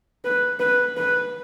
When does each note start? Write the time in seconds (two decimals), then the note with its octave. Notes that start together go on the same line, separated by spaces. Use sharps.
0.25 B4
0.60 B4
0.97 B4